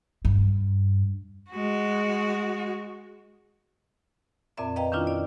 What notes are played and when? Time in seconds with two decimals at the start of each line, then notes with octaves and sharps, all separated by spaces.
0.25 G2
1.51 G#3 F#4
4.57 F2 A#2 C4 D5 E5 A#5
4.76 B4 D#5 F5 G5 A#5
4.92 D#3 C#4 D4 E4 F4
5.07 D5